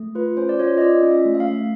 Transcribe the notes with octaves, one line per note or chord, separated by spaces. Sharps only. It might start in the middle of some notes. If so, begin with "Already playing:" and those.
Already playing: A3
F4 B4
C#4 C5
D5
F4 C#5
D#5
F4 D5
C#4
E5
A3
E5
F5
A3